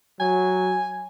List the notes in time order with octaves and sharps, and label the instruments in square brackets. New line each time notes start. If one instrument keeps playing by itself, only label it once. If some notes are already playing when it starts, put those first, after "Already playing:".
[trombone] F#3 [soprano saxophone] G#5